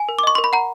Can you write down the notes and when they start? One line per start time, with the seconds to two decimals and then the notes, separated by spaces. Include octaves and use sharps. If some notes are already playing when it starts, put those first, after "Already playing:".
Already playing: G#5
0.09 A#4
0.19 D6
0.23 D#5 C#6
0.35 A#4 C6
0.44 B5
0.53 F#5 A#5